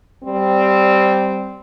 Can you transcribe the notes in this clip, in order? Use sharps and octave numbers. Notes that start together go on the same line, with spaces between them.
G3 C4